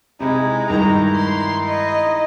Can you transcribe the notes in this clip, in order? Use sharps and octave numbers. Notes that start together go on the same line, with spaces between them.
C3 G#3 D#4 E4
G2 D#3 G#3 A#5
C6
D#5